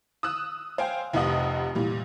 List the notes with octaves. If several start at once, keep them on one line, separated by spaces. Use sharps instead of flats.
D#6 E6 F#6
C5 F5 G5 G#5
F1 F2 C3 D#5 F#5 D#6
A#2 E3 G3